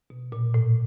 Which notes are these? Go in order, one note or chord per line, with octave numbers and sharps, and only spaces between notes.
B2
A#2
A2